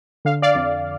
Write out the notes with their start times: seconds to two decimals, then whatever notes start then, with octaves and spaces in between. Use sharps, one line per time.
0.25 D3 F5
0.42 D5 F5
0.55 F2